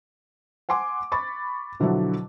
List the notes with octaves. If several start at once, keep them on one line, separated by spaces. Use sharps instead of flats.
F#5 G#5 C6 D6
B5 C#6 A6
B2 D3 F3 F#3 E4